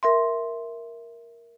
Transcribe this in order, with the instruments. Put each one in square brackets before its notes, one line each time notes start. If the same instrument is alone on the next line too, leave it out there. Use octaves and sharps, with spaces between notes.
[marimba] A#4 E5 C6